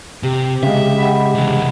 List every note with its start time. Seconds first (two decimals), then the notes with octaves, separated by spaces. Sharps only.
0.23 C3 G4
0.63 C#3 G#3 E5 F5
0.95 D#5 F#5 B5
1.35 C3 E3